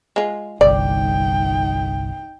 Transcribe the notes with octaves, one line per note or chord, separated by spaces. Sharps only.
G#3 F4
G1 C2 D#4 D5 G5